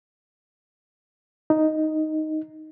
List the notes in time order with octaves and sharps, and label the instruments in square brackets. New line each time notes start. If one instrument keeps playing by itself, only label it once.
[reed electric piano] D#4